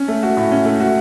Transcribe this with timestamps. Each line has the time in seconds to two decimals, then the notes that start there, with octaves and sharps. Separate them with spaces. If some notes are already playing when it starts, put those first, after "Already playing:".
Already playing: C#4
0.08 A3
0.23 F#4
0.37 A2
0.51 C#4
0.65 A3
0.80 F#4